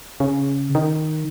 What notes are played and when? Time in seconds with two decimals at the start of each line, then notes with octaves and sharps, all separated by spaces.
0.20 C#3
0.75 D#3